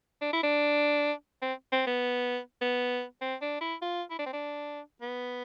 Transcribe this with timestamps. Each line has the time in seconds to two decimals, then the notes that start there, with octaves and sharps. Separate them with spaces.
0.22 D4
0.33 E4
0.43 D4
1.42 C4
1.72 C4
1.87 B3
2.61 B3
3.21 C4
3.42 D4
3.61 E4
3.82 F4
4.11 E4
4.19 D4
4.26 C4
4.33 D4
5.02 B3